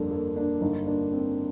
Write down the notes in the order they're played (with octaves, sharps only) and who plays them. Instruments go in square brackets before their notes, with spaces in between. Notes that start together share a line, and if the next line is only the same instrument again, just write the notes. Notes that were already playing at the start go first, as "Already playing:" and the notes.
Already playing: [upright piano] G1 F2 A#3 [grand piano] D4 A4
[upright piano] A#3 [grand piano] A4
[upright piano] A#3 [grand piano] D4
[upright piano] G1 [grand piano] D#4
[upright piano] A#3 [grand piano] D4
[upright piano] A#3 [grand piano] C4